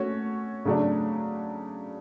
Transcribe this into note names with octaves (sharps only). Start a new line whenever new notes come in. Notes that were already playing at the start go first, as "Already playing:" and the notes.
Already playing: A3 C#4 F#4 C#5
C#3 F#3 A3 D4